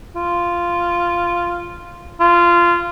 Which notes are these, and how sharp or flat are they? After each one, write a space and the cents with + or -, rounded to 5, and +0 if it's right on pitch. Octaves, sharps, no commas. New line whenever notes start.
F4 -10
F4 -20